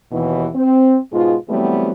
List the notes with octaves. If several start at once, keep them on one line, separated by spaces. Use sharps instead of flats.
D#2 B2 E3
C4
G#2 B2 G#3 F4
E3 F#3 G3 A3 B3 C4